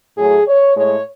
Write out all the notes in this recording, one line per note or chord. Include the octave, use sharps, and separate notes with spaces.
A2 F#3 A3 G#4
C#5
A2 G#3 C#5